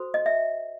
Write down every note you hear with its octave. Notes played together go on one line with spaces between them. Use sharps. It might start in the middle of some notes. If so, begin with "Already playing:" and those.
Already playing: F#4 A4 C5
D#5
E5